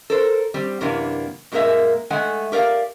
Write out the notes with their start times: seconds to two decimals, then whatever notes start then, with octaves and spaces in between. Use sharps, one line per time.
0.10 A4 A#4 C5
0.54 G3 C4
0.81 F#2 C3 E3 A#3 D4
1.52 F#2 A#2 G#3 A#3 A#4 E5
2.10 G#3 A3 F#5 G#5
2.52 G4 A#4 D5 F5